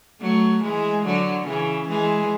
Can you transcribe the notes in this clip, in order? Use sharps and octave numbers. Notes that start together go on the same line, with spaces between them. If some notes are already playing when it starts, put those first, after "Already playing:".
F#3 A3
E3 G#3
D3 F#3
C#3 E3
E3 G#3